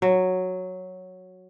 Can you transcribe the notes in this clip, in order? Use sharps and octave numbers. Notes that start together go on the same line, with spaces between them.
F#3